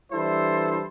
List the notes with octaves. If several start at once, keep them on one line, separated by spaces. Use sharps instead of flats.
E3 G3 D4 E4 A4 C5